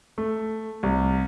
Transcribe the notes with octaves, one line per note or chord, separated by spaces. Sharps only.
A3
C2